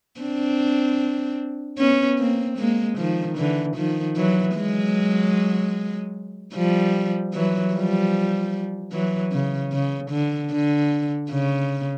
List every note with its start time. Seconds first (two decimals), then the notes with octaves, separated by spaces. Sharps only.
0.20 C4 D4
1.78 B3 C#4
2.19 A#3 C4
2.58 G#3 A#3
2.98 D#3 F3
3.37 D3 E3
3.76 D#3 F3
4.16 E3 F#3
4.56 F#3 G#3
6.54 F3 G3
7.33 E3 F#3
7.74 F3 G3
8.92 E3 F#3
9.32 C#3
9.72 C#3
10.11 D3
10.52 D3
11.30 C#3